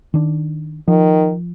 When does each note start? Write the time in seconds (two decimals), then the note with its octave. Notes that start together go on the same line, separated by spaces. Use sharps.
0.14 D#3 D4
0.88 D#3 F3